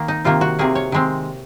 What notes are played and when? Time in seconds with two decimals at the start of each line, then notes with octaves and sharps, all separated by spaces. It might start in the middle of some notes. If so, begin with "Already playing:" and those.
Already playing: D#3 A#3
0.08 D#4
0.24 C3 D#3 A#3 F4
0.41 F#4
0.59 C3 D#3 A#3 G#4
0.75 C#5
0.92 D#3 G#3 C4